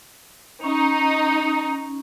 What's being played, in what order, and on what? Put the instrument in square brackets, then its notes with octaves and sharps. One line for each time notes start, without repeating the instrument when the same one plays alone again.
[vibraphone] C#4 [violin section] D#4